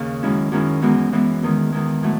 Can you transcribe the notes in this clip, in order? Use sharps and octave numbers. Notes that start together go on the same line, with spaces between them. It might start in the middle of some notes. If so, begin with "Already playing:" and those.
Already playing: D#2 C#3 D#4
F#2 D#3 G#3 C#4 E4
F#2 D#3 G#3 C#4 E4
F#2 E3 G#3 B3
F#2 E3 G#3 B3
E2 D#3 G#3
E2 D#3 G#3
A2 F#3 A3